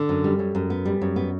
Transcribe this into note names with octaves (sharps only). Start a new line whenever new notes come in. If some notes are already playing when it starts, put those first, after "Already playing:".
Already playing: D3
F#2
G3
F#2
F#2
B3
G3
F#2
B3